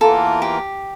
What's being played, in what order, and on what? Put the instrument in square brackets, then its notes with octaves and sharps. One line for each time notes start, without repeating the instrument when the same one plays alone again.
[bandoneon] E2 E3 A#3 F4 A#4 [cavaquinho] A4
[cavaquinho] G4